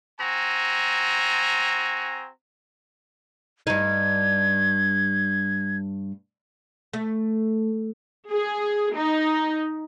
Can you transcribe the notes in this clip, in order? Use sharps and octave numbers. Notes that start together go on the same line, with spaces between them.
C4 F#4 G#5 A#5
G2 D#4 G#6
A3
G#4
D#4